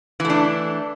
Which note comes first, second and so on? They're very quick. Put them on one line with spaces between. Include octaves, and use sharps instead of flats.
E3 A3 D4